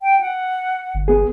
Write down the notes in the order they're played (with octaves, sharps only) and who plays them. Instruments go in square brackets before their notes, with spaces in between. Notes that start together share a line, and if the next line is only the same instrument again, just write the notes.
[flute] G5
F#5
[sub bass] G1
[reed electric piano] B3 G#4